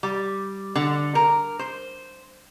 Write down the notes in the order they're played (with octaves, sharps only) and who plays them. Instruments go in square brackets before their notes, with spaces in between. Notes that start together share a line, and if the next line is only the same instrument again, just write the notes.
[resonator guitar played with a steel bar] G3
D3
A#4
C5